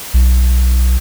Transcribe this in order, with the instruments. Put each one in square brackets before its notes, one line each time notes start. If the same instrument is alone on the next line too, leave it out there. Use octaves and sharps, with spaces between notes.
[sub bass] B1